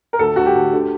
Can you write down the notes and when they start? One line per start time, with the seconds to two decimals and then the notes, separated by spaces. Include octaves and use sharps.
0.13 A#4
0.19 D2 A4
0.36 D2 F#4
0.46 G4
0.55 D2
0.73 D3